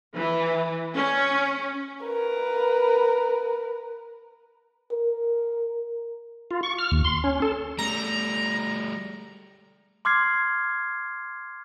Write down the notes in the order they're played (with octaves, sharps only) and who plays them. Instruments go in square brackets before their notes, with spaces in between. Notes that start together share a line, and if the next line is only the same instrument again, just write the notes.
[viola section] E3
C#4
[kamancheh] A#4 B4
[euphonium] A#4
[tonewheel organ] F4
C#6
F6
D#2
C6
C#4
A4
[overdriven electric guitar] G3 A3 [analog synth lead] A#5
[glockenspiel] C6 D6 F6 G#6 C7